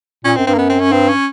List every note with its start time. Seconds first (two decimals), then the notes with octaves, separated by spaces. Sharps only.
0.25 A#2 C#4
0.36 F#2 C4
0.47 G2 C4
0.54 A#3
0.58 F#2 B3
0.70 C4
0.80 C#4
0.92 G2 C4
1.09 C#4